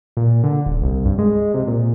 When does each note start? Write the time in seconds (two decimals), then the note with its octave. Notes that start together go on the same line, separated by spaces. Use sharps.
0.17 A#2
0.44 D3
0.66 D#1
0.82 C2
1.05 G2
1.18 G#3
1.54 C3
1.67 A#2